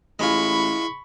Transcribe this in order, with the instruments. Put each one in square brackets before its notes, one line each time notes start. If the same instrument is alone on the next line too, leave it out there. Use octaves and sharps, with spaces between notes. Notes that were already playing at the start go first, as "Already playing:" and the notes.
[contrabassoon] A1 [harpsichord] G#3 F4 [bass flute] E4 [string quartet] B5 C#6